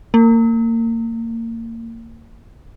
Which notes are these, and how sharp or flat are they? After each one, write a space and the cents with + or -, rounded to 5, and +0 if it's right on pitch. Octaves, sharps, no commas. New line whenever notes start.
A#3 -30